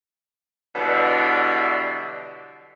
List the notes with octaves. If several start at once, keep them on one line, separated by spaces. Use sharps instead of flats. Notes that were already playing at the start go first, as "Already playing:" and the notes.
B2 D3 E3 F#3 G3 D4